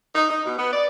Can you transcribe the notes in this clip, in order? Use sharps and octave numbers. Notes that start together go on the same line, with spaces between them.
D#4
D#4
B2
B3
D5